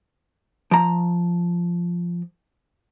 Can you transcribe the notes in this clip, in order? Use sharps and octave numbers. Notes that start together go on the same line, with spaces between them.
F3 A#5